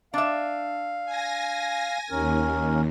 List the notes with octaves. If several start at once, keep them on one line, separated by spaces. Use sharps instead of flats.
D4 E5 F5
G#5 A#6
D#2 C#4 A#4